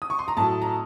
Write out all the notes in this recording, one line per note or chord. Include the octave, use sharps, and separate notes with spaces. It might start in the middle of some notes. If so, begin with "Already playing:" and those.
D#6
C#6
C6
A#5
A2 F#3 A5
A#5